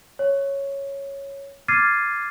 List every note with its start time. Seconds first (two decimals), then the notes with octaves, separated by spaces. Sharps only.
0.19 C#5
1.68 D6 F6 G#6 A6 C7 D#7